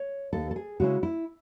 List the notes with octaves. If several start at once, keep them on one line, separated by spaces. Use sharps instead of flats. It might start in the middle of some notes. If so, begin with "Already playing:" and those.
Already playing: C#5
D#2 A4
A4
G#4
C#3 G#3 C#4 E4 F#4
E4